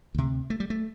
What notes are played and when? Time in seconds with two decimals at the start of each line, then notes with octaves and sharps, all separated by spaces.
0.15 D2 C3
0.50 A3
0.60 G3
0.70 A3